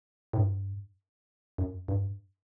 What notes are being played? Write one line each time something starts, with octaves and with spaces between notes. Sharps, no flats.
A2
G2
F#2
G2